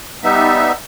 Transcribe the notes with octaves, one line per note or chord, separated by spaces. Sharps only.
G3 B3 D#4 E5